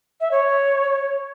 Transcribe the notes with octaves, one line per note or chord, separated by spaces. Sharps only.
E5
C#5